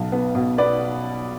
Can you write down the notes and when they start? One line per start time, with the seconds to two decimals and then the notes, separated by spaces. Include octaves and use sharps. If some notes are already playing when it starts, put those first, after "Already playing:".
Already playing: B1 F#3 A5
0.12 B3
0.35 B2
0.58 B3 B4 D5